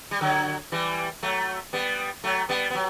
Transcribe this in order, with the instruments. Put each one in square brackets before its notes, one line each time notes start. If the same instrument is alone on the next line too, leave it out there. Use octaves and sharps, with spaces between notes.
[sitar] G3
D3 F#3
E3 G3
F#3 A3
G3 B3
F#3 A3
G3 B3
B3
F#3